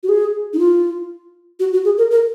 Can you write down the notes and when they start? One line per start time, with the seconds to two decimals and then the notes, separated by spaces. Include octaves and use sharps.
0.03 F#4
0.09 G#4
0.53 D#4
0.59 F4
1.60 F#4
1.73 F#4
1.85 G#4
1.98 A#4
2.11 A#4